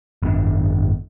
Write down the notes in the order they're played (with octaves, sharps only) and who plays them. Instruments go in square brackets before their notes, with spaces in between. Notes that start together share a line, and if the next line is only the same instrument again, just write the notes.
[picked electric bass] G#1 F#2 B3 D4